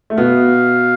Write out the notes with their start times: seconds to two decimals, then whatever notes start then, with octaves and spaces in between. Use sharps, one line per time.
0.10 A3
0.18 B2 B3 F5